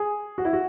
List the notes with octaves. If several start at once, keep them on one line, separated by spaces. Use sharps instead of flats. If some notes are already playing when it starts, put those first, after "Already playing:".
Already playing: G#4
F#4
E4
F#4